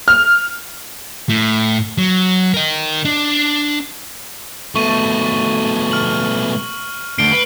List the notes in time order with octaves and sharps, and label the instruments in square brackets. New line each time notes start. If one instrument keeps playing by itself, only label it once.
[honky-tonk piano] F6
[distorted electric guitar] A2
F#3
A#4 D#5
D4
[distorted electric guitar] B2 A3 [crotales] C#6 D#7
[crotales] F6 F#7
[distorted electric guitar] D2 [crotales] C7 D7 G7
[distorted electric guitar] B4